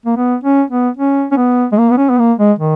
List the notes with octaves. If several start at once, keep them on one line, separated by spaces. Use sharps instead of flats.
A#3
B3
C#4
B3
C#4
C#4
B3
G#3
A#3
B3
C#4
B3
A#3
G#3
D#3